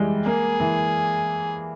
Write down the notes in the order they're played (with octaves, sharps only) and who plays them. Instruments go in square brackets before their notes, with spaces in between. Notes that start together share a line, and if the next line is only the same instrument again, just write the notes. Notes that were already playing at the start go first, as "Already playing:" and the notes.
Already playing: [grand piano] E3 G3 G#3
[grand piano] A#3 [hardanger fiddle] G#4
[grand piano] E3